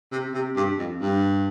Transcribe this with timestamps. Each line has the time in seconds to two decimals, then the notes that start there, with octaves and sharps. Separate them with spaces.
0.12 C3
0.34 C3
0.56 G2
0.78 F2
1.01 G2